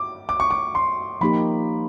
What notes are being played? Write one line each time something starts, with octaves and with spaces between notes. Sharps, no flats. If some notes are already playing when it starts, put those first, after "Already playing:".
Already playing: D6
D6
C#6
D6
C6
F3 A#3 D#4 G4 B5